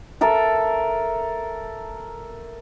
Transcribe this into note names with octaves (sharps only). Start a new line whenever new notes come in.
A4 A#4 E5 A5